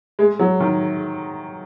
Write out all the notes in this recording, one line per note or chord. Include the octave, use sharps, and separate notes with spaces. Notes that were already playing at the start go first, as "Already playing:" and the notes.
G#3
F#3
D#3